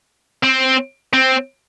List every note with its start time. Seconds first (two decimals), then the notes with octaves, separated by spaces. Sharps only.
0.43 C4
1.14 C4